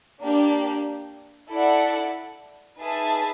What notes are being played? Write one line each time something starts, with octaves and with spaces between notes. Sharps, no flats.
A#3 D4 G4
E4 A4 D5 F#5
D#4 G#4 B4 E5 A5